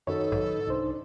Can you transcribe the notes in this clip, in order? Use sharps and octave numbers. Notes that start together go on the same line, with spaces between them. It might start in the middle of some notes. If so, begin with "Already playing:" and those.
F#2 D#3 D#4 F#4 A4 B4 C#5
B1 G#2
C2 D4 D#4 C5